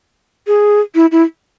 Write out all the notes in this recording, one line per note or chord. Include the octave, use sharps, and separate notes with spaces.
G#4
E4
E4